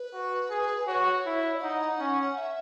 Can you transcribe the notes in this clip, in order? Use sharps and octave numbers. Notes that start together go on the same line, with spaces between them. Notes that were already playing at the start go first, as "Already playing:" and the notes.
Already playing: B4
F#4
G#4
F#4 C#5
E4
D#4 F#5
C#4
E5